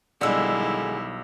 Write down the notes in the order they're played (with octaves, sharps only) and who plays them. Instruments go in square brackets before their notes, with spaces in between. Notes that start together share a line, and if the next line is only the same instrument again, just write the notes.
[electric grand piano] B1 E6 [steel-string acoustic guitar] D3 G#3 [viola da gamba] D#3 G3 E4